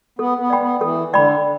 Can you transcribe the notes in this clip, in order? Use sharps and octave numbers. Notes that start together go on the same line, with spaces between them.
B3 A4
B3
D5 G5 B5
B3
E3 A4
D3 D5 G5 B5